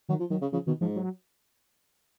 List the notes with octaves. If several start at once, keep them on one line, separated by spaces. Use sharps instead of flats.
D#3 F#3
F3
D#3 F#3
C#3
C#3 F3
B2 D#3
G#2 F3
F#3